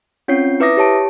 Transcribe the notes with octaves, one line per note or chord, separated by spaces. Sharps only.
C4 C#4 F4 C#5 G6 C7
E4 B4 E5 D6 D#6 A#6
G4 C#5 A5 D7